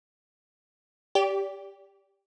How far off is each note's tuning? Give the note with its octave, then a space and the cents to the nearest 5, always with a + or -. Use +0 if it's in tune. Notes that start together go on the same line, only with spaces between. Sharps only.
G4 +0 D5 -35